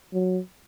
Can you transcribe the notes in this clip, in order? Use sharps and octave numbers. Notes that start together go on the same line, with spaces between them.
F#3